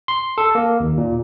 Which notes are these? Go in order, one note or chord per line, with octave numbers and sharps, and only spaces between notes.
C6
A4
A#3
D#2
A#2